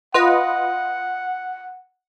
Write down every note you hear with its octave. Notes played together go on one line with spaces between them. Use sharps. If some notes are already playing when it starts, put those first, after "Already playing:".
F4 B4 D#5 F#5